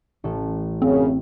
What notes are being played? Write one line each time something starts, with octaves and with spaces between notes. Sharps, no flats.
A1 A4
F#2 C#3 C4